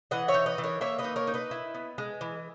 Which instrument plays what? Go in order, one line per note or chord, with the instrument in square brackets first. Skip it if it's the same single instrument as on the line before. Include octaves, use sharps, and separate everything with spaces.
[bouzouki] E3 D#5 F#5
C#5 E5
D#4
B4 D#5
E3
A#4 C#5
A#3 C#5 E5
B4 D#5
D#4
A#4 C#5
D#4
B4 D#5
E4
B3
G#3
E3